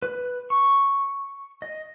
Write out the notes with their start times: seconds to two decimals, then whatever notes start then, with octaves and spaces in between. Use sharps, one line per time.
0.02 B4
0.50 C#6
1.62 D#5